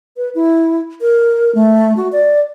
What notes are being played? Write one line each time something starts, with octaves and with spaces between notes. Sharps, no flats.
B4
E4
A#4
A3
F#4
D5